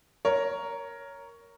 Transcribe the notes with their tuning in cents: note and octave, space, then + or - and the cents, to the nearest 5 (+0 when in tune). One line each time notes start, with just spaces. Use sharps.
A#4 +0 C#5 +10